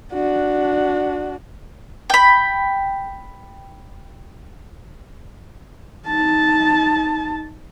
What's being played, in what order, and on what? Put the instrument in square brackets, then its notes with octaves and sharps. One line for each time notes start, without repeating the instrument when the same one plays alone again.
[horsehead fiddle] D4 F#4
[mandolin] G5 B5
[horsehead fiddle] D#4 A5